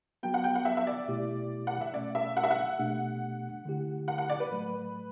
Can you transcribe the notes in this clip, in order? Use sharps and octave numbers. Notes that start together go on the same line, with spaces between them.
F#3 B3 F#4 G5
F#5
G5
F#5
E5
E5
D5
B2 A3 E4 G4
F#5
E5
B2 A3 C#4 D5
E5
F#5
E5
F#5
B2 A3 D4 G4
D3 A3 E4 G4
F#5
F#5
D5
B4
A2 F#3 A3